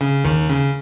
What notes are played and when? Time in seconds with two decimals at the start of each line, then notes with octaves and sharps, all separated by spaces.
0.01 C#3
0.24 D#2 D#3
0.49 C#3